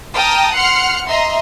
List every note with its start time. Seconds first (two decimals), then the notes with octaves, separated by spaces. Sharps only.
0.14 G5 A5 A#5 D#6 F6
0.54 F#5 C6 F6 C7 C#7
1.07 D#5 E5 A#5 C6